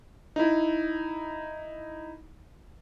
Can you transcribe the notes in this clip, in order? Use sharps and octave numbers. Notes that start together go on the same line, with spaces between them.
D#4 E4